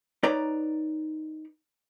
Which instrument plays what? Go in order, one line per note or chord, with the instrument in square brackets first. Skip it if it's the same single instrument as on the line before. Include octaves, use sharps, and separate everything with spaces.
[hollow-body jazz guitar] D#4 B4 C#5 D5 A#5